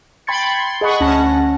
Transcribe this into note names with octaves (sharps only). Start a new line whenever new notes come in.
G5 B5 C6 G#6 A6 C#7
C6
G#4 D#5 F#5 B5 C#6
D2 C#4 F#5 A5 A#6